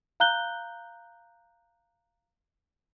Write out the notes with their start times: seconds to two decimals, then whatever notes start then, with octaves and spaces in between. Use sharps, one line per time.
0.20 F5 A#5 F#6 G6 G7